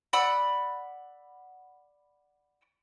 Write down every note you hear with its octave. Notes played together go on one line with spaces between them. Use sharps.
D5 F#5 B5 E6